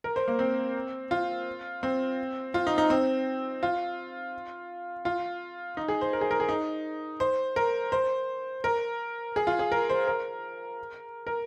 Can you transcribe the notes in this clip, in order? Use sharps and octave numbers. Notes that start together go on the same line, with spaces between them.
A#4
C5
A#3
C4
F4
C4
F4
D#4
D#4
C4
F4
F4
D#4
G#4
C5
A#4
G#4
A#4
G#4
D#4
C5
A#4
C5
A#4
G#4
F4
G#4
A#4
C5
A#4
A#4